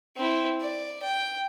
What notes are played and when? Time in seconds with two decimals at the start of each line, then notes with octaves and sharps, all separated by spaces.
0.16 C4 E4
0.61 D5
1.02 G5